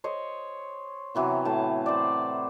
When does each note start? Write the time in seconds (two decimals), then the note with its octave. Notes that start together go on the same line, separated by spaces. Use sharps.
0.04 C5 C#5 D#5
1.15 C3 E3 F#3 B3
1.45 A2 A5
1.86 C5 D5